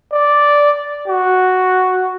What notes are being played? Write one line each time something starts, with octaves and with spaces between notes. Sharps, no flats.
D5
F#4